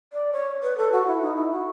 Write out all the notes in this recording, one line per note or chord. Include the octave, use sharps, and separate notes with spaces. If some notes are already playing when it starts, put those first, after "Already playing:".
D5
C#5
B4
A4
F#4
E4
D#4
E4
F#4